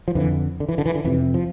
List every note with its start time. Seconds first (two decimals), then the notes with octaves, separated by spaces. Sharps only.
0.08 F3
0.15 F2 D3 E3
0.60 D3
0.69 E3
0.78 D3
0.86 E3
0.95 D3
1.04 F2 C3 E3
1.34 F3